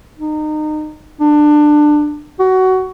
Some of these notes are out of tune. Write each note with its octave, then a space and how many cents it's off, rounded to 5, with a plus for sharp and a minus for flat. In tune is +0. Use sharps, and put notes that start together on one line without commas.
D#4 -30
D4 +20
F#4 +20